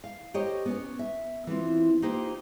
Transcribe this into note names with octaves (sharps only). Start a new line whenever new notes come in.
F5
G4 A#4 C5 C#5 D#5
B3 C#4
E5
E3 B3 C4 F4
A#3 D#4 F4 G4 B4 C5